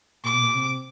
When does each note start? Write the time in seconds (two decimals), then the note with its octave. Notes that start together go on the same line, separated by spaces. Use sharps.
0.24 A#2 D6
0.33 B2
0.42 A#2
0.54 C3